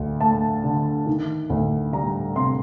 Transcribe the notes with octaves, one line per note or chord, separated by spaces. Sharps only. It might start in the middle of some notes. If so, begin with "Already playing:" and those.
Already playing: D2
A3 A5
D3
D#3
D2
G3 A#5
C3 C6